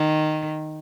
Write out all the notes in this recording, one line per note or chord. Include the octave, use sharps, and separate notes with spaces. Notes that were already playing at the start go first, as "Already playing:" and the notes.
Already playing: D#3